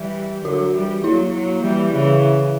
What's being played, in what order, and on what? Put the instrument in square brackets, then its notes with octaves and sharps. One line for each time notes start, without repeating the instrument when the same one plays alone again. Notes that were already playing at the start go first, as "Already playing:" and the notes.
Already playing: [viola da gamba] E3 G3
[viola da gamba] D3 F#3 [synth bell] F#4
[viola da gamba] E3 G3
[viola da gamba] F#3 A#3 [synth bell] E4
[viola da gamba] F#3 A#3
E3 G3
C#3 E3